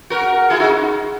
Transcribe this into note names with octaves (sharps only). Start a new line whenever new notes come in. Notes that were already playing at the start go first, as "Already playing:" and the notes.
F#4 A#4
E4 G#4
D#4 F#4